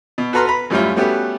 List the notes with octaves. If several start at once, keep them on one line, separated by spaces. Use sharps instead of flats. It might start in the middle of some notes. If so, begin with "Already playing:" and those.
B2
F#4 A4 B4 A#5 C6 F6
B4 A#5 B5
F#2 A2 G3 C#4 E4 F4
G3 A3 B3 C#4 F#4 G4